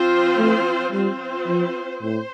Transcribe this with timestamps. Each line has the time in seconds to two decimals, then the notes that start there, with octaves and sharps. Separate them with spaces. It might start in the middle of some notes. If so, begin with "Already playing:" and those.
Already playing: F3 C4 F4 C5
0.38 A3
0.92 G3 C4 F4 C5
1.47 F3
2.02 A2 C5